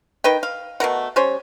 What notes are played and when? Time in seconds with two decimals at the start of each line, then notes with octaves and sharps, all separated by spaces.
0.24 D#3 B4 G5
0.43 F5
0.80 B2 A3 A#4 F#5
1.16 G3 C#4 C5 C#5